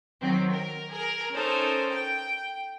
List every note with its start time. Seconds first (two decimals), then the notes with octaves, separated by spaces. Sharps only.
0.21 D#3 F#3 C4
0.53 A#4
0.91 G#4 A#4
1.34 C#4 D#4 A4 A#4 C5
1.91 G5